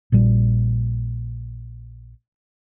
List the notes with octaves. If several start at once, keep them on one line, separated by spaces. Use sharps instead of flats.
A#1 A#2 G3